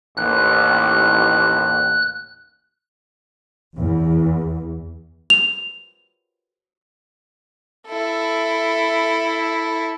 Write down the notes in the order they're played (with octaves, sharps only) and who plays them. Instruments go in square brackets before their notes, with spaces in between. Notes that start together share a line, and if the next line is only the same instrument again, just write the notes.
[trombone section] A1 D#2 [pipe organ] F#6
[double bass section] E2
[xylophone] F7
[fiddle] E4 A4